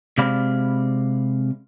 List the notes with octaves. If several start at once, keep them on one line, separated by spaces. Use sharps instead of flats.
C3 G#3 C4 D5 F5 B5